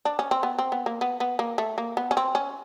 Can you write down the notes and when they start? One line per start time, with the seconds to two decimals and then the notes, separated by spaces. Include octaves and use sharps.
0.05 D4
0.19 C#4
0.31 C4
0.43 B3
0.59 C4
0.72 B3
0.86 A#3
1.01 B3
1.20 B3
1.39 A#3
1.58 A3
1.78 A#3
1.97 B3
2.11 C#4
2.17 C4
2.35 C#4